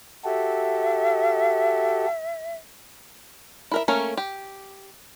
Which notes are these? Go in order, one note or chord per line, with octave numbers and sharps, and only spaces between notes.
F#4 G4 A4 E5
E4 A#4 E5
A3 A#3 C#4 A#4
G4